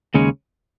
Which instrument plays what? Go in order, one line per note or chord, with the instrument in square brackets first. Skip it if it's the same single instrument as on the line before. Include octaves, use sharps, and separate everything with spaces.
[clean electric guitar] D#2 C#3 G#3 C#4